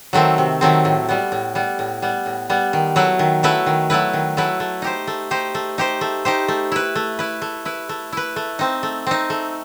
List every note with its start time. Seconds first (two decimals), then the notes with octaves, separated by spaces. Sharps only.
0.13 D#3 F#3 A3 C4
0.38 C3
0.61 D#3 F#3 A3 C4
0.85 A2
1.09 G3 B3
1.32 A2
1.55 G3 B3
1.79 A2
2.02 G3 B3
2.26 A2
2.50 G3 B3
2.73 D#3
2.96 F#3 A3 E4 B4
3.19 D#3
3.43 F#3 A3 E4 B4
3.66 D#3
3.90 F#3 A3 E4 B4
4.13 D#3
4.37 F#3 A3 E4 B4
4.60 A3
4.82 D#4 G4 C5
5.07 A3
5.31 D#4 G4 C5
5.55 A3
5.78 D#4 G4 C5
6.01 A3
6.25 D#4 G4 C5
6.48 A3
6.72 E4 B4
6.96 A3
7.19 E4 B4
7.42 A3
7.65 E4 B4
7.89 A3
8.12 E4 B4
8.36 A3
8.59 C4 D#4
8.83 A3
9.07 C4 D#4
9.30 A3